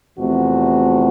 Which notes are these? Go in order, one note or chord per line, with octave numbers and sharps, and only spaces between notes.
E2 C3 F3 A3 C4 F#4